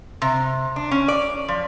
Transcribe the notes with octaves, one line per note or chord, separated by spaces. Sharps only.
C3
D4
C#4
D5
F3